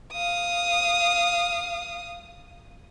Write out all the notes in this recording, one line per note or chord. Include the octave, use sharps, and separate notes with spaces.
F5 D#6